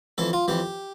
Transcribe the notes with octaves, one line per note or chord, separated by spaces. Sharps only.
F2 E3 A4
F4
F2 E3 G4